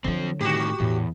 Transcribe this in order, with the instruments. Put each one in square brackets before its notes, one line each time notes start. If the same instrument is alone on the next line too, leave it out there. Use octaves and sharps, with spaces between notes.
[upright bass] D3 F#3 [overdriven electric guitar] F3 C4
[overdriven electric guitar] A2 D#3 [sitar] F#4 G4
[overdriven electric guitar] E2 [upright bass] A2